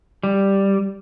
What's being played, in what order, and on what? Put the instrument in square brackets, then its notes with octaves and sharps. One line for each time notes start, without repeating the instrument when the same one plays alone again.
[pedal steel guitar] G3